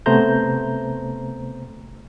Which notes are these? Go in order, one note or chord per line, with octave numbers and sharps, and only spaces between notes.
C3 A3 B3 C5 A#5 G6